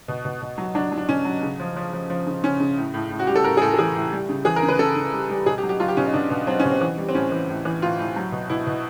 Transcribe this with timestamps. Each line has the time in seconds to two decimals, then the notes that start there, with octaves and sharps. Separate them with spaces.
0.08 B2
0.25 B2
0.42 B2
0.58 F#3
0.75 F#3 D4
0.92 F#3
0.98 D4
1.09 B2 C#4
1.25 F#3
1.42 C#3
1.60 F3
1.76 F3
1.93 F3
2.10 F3
2.27 C#3
2.43 C#3 C#4
2.60 C#3
2.77 A2
2.94 A2
3.11 A2
3.19 F#4
3.27 G3 G4
3.36 A4
3.44 A2 A#4
3.57 G#4
3.61 A2 A4
3.74 A4
3.78 E3 G#4
3.95 A2
4.12 G3
4.29 C#3
4.45 E3 G#4
4.56 A#4
4.63 C#3
4.68 B4
4.79 C#3 A4
4.96 C#3
5.13 G3
5.30 G3
5.46 B2 G#4
5.58 G4
5.63 F#3
5.69 G4
5.80 F#3 F4
5.88 G4
5.97 B2 C#4
6.05 D#4
6.13 B2 D4
6.30 B2
6.47 F#3 C4
6.59 C#4
6.65 B2
6.71 C4
6.81 E3
6.98 G3
7.09 C4
7.14 A2 C#4
7.32 E3
7.49 A2
7.65 E3
7.82 A2 F4
7.99 A2
8.16 F#3
8.32 B2
8.50 B2 E4
8.67 B2